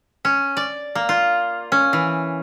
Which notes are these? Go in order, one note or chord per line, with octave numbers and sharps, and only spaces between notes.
C#4
D5
A#3
F4
C#4
E3